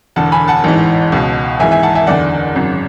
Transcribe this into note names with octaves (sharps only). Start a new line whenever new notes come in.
E1 E2 D3 F#5 A5
G#5 B5
F#5 A5
A1 G#2 E3
C#2 B2
G#1 G#2 E3 E5 G#5
E5 G#5
F#5 A5
E5 G#5
F#1 E2 D3 D5 F#5
G#1 F#2 C#3